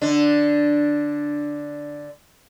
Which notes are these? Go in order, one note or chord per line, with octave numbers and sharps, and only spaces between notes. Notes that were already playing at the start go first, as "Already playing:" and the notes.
D3 D4